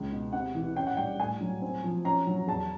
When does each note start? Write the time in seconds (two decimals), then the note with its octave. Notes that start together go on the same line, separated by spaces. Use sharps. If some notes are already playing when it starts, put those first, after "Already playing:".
Already playing: C#2 C#3
0.12 B2
0.33 C3 F#5
0.55 E3
0.76 C#4 G5
0.87 F#5
0.97 G3 G5
1.19 A2 G#5
1.41 F#3
1.62 C4
1.83 F3
2.05 C#4 A#5
2.27 F#3
2.47 E2 A5